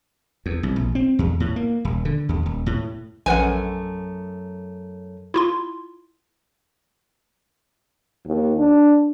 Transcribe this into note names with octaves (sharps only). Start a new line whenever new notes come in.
E2
C2
A#1
C4
E2
A2
A#3
D#1
D3
D#2
D#1
A2
A#1 F#2 A3 B4 F#5 G#5
E4 F4 C6
D#2
D4